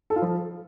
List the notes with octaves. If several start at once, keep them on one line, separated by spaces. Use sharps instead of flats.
A4
F4
F3